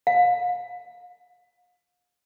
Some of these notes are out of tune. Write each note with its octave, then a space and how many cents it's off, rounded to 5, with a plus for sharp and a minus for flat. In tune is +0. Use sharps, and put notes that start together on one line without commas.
F5 +35